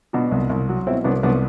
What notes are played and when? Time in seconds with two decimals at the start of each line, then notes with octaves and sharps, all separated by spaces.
0.13 B2 D4 F#4
0.32 C2
0.50 C2
0.69 F#3
0.87 B2 C4 E4
1.04 C2 B3 D4
1.23 C2 B3 D4